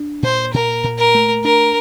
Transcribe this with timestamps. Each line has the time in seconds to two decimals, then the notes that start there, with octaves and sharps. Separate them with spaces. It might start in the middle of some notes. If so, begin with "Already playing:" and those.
Already playing: D4
0.23 A#2 C5
0.53 A#2 A#4
0.84 A#2
0.98 A#4
1.15 A3
1.44 D4 A#4